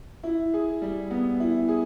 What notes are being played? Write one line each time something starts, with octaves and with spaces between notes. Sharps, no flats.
E4
G#4
G3
B3
E4
G#4